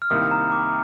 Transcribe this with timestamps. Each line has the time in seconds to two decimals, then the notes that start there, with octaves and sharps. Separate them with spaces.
0.02 F6
0.10 C2 C3 D#3 A#3 D#6
0.31 A#5
0.52 D6